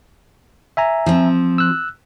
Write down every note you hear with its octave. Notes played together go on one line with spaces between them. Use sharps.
E5 G#5 A#5
F3 C4
E6 F#6